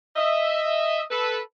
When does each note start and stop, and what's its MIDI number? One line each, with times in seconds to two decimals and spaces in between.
0.16 1.02 75
0.16 1.02 76
1.10 1.39 69
1.10 1.39 71